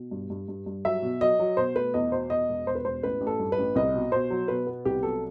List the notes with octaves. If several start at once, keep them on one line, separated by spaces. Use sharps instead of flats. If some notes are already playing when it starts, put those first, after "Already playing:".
Already playing: B2
G2
G2
G2
G2
F#3 E5
B2
F#3 D#5
F#3
B2 C5
A3 B4
E2 D#5
B2 C5
E2 D#5
E1
E1 C5
B4
E1 C5
A1 B4
A1
A4
G2
B4
A1
C2 D#5
B2
B2 C5
F#3
B2 B4
B3
C2 G4
F#3 A4